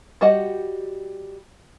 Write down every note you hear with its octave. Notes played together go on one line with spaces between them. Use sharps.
G3 F#4 G4 D#5 F#5